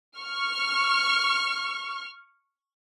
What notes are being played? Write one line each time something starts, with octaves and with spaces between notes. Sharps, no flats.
C#6 F6